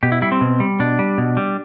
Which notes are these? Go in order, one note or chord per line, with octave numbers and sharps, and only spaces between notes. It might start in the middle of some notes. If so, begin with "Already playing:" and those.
B2 G4
E4
G3 E4
C4
B2
G3
B2 D4
G3
B2
G3